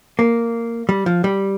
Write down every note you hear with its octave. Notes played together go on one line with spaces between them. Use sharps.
A#3
G3
F3
G3